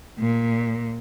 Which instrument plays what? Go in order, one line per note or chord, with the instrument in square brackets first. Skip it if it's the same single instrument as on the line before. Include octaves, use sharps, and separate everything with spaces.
[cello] A#2